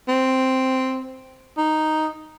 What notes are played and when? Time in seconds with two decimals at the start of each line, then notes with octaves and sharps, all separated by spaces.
0.08 C4
1.57 D#4